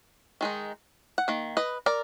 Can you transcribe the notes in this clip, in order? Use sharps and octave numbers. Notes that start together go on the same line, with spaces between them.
D#3 G#3 D#4
F#5
D#3 A#3
B4 D#5
A#4 D5